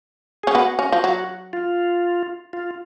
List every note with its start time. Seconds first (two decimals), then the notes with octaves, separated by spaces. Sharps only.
0.43 C#4 G#4
0.54 B3 F#4
0.79 C#4
0.92 F3
1.04 F#3
1.53 F4
2.53 F4